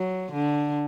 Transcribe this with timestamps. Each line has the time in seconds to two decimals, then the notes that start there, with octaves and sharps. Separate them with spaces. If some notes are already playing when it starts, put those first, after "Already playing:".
Already playing: F#3
0.33 D3